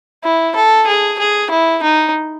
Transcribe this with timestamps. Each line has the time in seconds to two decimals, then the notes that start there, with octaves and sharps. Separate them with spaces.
0.24 E4
0.56 A4
0.87 G#4
1.19 G#4
1.51 E4
1.83 D#4